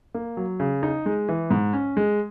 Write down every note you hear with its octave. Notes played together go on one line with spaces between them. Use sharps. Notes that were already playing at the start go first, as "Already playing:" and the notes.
A#3
F#3
C#3
D#4
G#3
E3
G#2
C#4
G#3